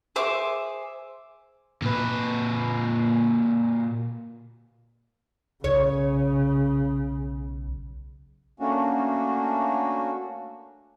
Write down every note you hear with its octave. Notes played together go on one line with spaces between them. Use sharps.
G#4 C5 E5 D6
A#2 B4
B1 C#3 C#5
A3 A#3 C#4 D4 F#4